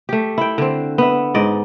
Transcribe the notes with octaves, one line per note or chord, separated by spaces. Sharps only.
A3 G4
E4 G5
D3 C4
B3 E5
G#2 D5 D#5